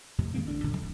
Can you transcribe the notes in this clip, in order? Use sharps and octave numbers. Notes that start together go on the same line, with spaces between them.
F2 A2 C3
D#3 G#3 A#3 C4
A1 D3 D4
D1 A#1 F#2 D3
D1 F2